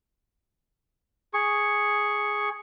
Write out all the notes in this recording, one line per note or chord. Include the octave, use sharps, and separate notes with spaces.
G#4 C#6